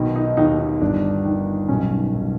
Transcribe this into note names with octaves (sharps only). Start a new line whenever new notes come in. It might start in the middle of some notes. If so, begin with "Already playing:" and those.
Already playing: B1 B2 D#3
D#4
D#2 D#4
D#4
G1 D4
D#3
B1 C#4
B1